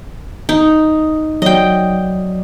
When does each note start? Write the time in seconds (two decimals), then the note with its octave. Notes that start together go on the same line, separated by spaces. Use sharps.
0.49 D#4
1.42 F#3 D5 D#5 G5